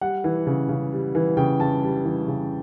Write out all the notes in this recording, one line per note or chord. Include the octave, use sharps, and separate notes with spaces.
G3 F#5
E3
C#3
C#3
G3
E3
C#3 G5
C#3 A5
G3
E3
C#3